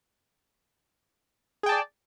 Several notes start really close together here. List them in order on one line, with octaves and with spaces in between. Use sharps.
G#4 G5 A5 D5